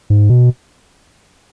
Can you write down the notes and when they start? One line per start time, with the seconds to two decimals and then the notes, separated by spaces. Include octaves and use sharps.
0.10 G#2
0.29 B2